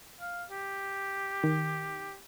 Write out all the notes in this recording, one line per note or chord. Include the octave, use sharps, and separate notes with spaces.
F5
G4
D#3